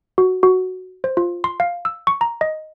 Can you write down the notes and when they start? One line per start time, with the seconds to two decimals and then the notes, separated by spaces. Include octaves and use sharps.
0.18 F#4
0.43 F#4
1.04 C5
1.17 F4
1.44 C6
1.60 F5
1.85 E6
2.07 C#6
2.21 A#5
2.41 D#5